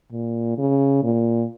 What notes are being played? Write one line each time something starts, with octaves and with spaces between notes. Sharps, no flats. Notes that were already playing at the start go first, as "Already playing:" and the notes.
A#2
C#3
A#2